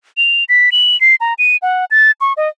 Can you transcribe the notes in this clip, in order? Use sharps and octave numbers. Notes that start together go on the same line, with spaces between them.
F7
B6
F#7
C7
A#5
D#7
F#5
A6
C#6
D#5